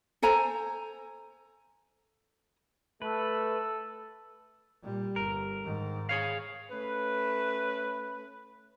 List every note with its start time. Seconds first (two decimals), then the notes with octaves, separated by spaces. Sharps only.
0.22 A4 C5 G#5 A#5
3.02 A3 A4 B4
4.82 A#2 G3
5.16 G1 A#4
5.64 G#2 D#3
6.09 G#4 C#5 F5
6.71 A3 C#4 B4